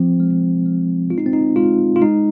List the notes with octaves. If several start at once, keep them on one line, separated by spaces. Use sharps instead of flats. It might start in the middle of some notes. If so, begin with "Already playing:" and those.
Already playing: F3 C4
G#3
G#3
G#3 F4
D#4
C4
D#4
G#3 F4
F4
G#3 D#4